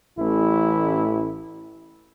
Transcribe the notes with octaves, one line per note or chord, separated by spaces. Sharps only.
A1 E4